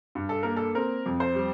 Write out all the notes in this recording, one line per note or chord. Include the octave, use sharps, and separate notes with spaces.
G2
A4
A#3 A#4
A4
C4 A#4
F2
C5
G3